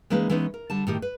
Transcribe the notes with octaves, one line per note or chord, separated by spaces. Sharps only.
E3 G#3 A#3 C#4 D#4 B4
E3 G#3 B3 C#4 D#4
A#4
D3 G3 A5
A2 D#3 G4
B4